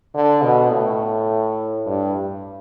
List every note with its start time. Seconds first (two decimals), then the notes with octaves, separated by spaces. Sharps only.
0.14 D3
0.42 B2
0.71 A2
1.86 G2